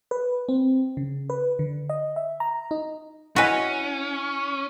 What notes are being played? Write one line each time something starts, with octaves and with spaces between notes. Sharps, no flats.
B4
C4
C#3
B4
D3
D#5
E5
A#5
D#4
C#4 E4 F#4 B4 D#5 G#5